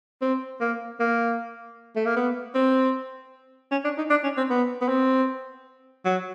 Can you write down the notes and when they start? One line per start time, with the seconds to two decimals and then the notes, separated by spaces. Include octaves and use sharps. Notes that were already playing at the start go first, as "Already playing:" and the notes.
0.21 C4
0.60 A#3
1.00 A#3
1.96 A3
2.06 A#3
2.16 B3
2.55 C4
3.72 C#4
3.84 D4
3.98 D#4
4.10 D4
4.23 C#4
4.37 C4
4.50 B3
4.81 B3
4.89 C4
6.05 F#3